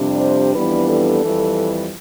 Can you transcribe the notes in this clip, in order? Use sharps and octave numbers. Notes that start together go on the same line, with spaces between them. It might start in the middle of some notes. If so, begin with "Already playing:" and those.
Already playing: F2 C3 G3 D4
C5
F2 E3 G3 B3 D4 B4
A4
F2 E3 G3